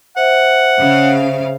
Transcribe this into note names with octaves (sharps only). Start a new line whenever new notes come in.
C5 E5 F#5
C#3 F5